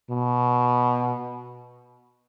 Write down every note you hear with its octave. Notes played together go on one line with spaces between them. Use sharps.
B2